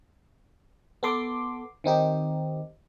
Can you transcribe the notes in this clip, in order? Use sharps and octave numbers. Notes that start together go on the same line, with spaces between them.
B3 A4 C6 D6
D#3 C4 D#4 G4